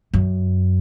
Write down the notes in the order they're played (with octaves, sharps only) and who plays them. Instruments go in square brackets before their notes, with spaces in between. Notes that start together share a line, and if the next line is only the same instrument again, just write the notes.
[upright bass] F#2